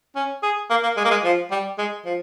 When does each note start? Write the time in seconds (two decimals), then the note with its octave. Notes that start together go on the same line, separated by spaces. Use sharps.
0.16 C#4
0.43 G#4
0.70 A#3
0.83 A#3
0.97 G#3
1.05 A#3
1.11 G#3
1.24 F3
1.51 G3
1.78 G#3
2.05 F3